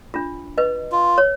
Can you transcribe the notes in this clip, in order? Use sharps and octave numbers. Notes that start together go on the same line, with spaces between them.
D4 F4
B4 D#5
F4
C#5